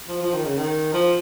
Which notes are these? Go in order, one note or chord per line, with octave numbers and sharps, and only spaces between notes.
F3
F3
D#3
C#3
D#3
F3